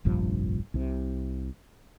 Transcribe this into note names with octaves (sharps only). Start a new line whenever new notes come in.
F1 A#1 G2 F3
C2 C3